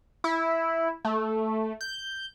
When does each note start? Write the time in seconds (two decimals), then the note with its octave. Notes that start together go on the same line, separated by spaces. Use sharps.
0.24 E4
1.05 A3
1.81 G6